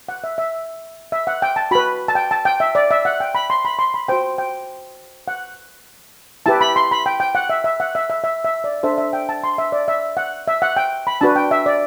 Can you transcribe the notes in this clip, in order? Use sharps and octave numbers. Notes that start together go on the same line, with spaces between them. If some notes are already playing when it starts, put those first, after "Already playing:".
F#5
E5
E5
E5
F#5
G5
A5
F#4 B4 B5
A5
G5
A5
G5
E5
D5
E5
F#5
G5
B5
C6
B5
C6
B5
F#4 C5 G5
G5
F#5
E4 G4 B4 A5
B5
C6
B5
G5
G5
F#5
E5
E5
F#5
E5
E5
E5
E5
D5
D4 A4 C5 E5
E5
G5
A5
C6
E5
D5
E5
F#5
E5
F#5
G5
B5
D4 F#4 B4 A5
G5
E5
D5